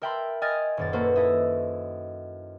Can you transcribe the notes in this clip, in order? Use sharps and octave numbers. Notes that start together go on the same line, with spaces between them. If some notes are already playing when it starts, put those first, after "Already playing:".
A#4 E5 G5 A5 B5 C6
D#5 G5 G#5 F6 A6 A#6
D#1 F#2 A6
A#3 F#4 A4 B4 C5
E4 A4 D#5 E5